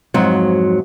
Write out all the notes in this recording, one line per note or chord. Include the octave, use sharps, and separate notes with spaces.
F2 G#2 F#3